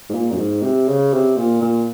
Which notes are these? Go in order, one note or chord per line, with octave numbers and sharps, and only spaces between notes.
G#2
A#2
F#2
G#2
C3
C#3
C3
A#2
A#2